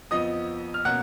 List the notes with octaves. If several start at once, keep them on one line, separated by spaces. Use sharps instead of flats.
F2 F3 B3 D#5 D#6
F6
B2 A#3 C#4 F#5 F#6